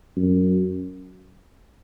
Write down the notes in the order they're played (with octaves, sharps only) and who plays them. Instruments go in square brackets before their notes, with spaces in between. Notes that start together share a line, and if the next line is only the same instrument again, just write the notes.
[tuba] F#2